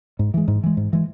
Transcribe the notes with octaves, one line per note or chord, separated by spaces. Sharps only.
G#2
E3 G#3
G#2
E3 G#3
G#2
E3 G#3